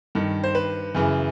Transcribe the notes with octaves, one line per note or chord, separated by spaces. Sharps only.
G2 D#3
C5
B4
F#2 C#3 E3